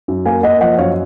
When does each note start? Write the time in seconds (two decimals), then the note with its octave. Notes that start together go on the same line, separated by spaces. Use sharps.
0.08 F#2
0.26 A#3 F5 G#5
0.43 A#3 D#5 F#5
0.61 F3 D#5 F#5
0.78 F#2 C#5 F5